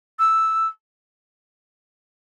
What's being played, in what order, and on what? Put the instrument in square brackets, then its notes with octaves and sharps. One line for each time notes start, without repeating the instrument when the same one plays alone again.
[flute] E6